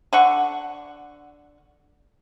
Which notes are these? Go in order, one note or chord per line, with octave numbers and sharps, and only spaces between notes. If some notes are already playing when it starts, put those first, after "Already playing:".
D3 F#5 C#6